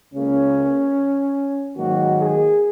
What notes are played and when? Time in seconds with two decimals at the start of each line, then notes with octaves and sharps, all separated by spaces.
0.14 C#2 C#3 A#3 C#4
1.78 G#2 D#3 F#3 A#3 F#4
2.20 G#4